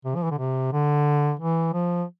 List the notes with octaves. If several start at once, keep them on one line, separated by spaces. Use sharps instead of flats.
C3
F3
E3
D3
C3
D3
E3
F3